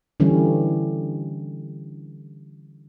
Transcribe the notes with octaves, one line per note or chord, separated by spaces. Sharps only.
D3 E3 G3 C#4